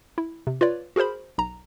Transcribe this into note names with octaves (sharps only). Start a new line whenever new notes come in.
E4
C3
F4 B4 C#5 D5
F#4 G#4 A#4 C5 B5
B1 A#5